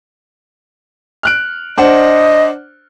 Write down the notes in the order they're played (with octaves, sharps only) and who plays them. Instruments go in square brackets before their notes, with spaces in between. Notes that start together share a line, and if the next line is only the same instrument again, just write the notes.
[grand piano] F6 F#6 D7
[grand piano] D4 C5 F#5 [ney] D#5